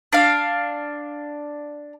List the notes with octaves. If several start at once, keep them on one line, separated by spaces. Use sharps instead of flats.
D4 F5